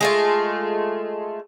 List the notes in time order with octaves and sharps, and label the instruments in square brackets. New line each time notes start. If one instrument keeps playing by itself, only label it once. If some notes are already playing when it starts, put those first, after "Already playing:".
[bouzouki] G#3 A3 F4